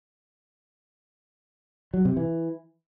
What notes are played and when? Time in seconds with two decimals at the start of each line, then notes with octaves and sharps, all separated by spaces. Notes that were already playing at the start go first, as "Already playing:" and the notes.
1.94 F#3
2.05 C3
2.17 E3